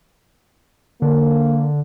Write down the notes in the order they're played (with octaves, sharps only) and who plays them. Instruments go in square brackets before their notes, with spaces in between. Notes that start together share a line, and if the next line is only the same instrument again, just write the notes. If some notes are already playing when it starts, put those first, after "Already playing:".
[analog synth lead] D3 [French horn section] A#3